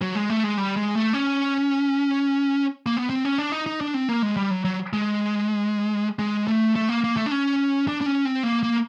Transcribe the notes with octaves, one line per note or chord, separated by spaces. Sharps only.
F#3
G#3
A3
G#3
G3
G#3
A3
C#4
A#3
B3
C4
C#4
D4
D#4
D#4
D4
C4
A#3
G#3
G3
F#3
F#3
G#3
G#3
A3
A3
A#3
A#3
A3
D4
C#4
D4
D4
C#4
C4
A#3
A#3